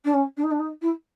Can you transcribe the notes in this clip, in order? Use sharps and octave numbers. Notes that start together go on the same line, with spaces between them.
D4
C#4
D4
D#4
D4
D#4
E4